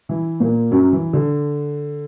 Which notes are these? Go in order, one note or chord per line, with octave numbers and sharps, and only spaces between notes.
E3 E4
A#2 A#3
F#2 F#3
E3
D3